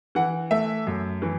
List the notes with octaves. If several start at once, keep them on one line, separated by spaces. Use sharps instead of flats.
E3 F#5
A3 E5
F#2
E3